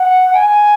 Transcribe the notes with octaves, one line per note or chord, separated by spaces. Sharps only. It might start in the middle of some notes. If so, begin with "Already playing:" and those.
Already playing: F#5
G#5